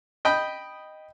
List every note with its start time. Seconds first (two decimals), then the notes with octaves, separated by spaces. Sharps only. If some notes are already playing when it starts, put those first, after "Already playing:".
0.25 D#5 G5 B5